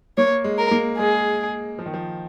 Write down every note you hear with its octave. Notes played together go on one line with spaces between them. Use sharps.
A#3 C#5
G#3
A#4
A#3
G#3 G#4
F3
D#3
F3